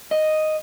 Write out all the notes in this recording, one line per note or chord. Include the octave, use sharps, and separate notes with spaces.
D#5